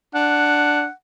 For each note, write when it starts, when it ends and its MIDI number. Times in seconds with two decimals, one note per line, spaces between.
0.14 0.86 62
0.14 0.91 78